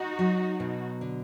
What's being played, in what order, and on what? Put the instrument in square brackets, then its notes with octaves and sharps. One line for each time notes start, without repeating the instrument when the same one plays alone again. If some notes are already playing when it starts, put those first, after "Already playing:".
Already playing: [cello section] D#4 F#4
[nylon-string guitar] F#3
B2
D3